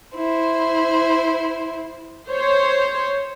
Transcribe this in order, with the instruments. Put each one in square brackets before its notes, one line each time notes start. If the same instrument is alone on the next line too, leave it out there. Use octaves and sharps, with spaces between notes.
[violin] E4 C5
[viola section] C5 C#5